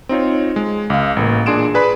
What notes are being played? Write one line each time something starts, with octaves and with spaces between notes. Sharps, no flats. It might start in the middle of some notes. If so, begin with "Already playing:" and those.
C4 D#4 F4 C#5
G#3
C#2 F5
A1 A#3
A#2 D4 G#4 C6 D7 E7
G#4 B4 D5 B5